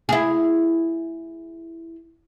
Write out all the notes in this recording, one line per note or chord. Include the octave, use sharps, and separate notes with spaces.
E4 G#4